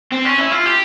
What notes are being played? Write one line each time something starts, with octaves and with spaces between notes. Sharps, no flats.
C4
C#4
E4
F4
G4